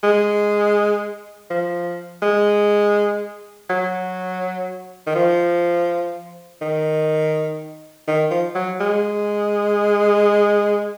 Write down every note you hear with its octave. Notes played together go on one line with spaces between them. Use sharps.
G#3
F3
G#3
F#3
D#3
F3
D#3
D#3
F3
F#3
G#3